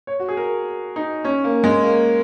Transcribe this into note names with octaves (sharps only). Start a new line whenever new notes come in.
C#5
F#4
G#4
A#4
D#4
C#4
A#3
G#3
A#3